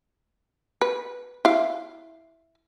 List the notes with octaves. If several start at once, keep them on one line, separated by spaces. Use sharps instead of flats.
B4
E4 F5